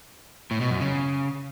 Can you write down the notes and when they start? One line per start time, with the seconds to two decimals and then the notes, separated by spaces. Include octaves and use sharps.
0.51 A2
0.61 B2
0.71 F#2
0.80 C#3